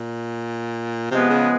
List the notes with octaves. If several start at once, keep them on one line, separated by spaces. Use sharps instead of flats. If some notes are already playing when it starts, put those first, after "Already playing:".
Already playing: A#2
C3 F3 G#3 B3
C#3